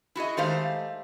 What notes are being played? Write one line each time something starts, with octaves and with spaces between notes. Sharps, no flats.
E4 F#4 G#4 D#5
D#3 G#3 A3 G4 C5 F5